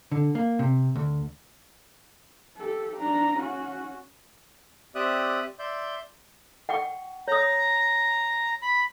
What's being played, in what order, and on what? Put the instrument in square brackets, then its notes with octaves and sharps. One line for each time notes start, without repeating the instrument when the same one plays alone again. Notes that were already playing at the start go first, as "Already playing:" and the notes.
[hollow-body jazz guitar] D3
A#3
C3
D2
[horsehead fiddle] G4 A4
D4 A#5
C#4 F#4
[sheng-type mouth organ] C4 G4 D5 E5 D#6 F#6
D5 E5 C6 G6
[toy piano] F#5 G5 C#6
[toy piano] C#5 D#6 [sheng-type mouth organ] A#5
[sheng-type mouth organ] B5